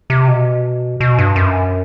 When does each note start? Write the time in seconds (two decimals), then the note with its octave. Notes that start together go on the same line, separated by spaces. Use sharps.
0.10 C3
0.28 B2
1.00 B2
1.18 G2
1.36 F#2